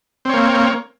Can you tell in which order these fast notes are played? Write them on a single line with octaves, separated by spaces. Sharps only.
C4 C#5 A#3